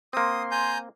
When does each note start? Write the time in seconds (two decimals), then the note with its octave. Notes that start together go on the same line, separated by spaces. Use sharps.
0.13 A#3 C4 C6 D#6
0.51 G#5 A#5 G6